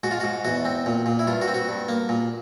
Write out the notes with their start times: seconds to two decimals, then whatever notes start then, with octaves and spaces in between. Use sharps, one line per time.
0.03 G#2 F#4
0.11 F4
0.20 G#2 F#4
0.45 E2 F#4
0.65 C4
0.86 A#2
1.06 A#2
1.19 E4
1.27 G2 F4
1.42 F#4
1.48 C4
1.54 F#4
1.69 G2
1.89 A#3
2.09 A#2